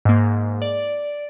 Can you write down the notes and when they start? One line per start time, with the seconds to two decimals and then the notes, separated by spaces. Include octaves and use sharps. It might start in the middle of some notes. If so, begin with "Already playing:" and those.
0.05 G#2 A#3
0.62 D5